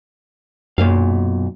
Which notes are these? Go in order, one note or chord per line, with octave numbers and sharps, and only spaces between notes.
B1 F#2 A#2 F5